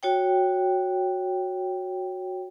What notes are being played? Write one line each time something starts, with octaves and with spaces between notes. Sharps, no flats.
F#4 C#5 G5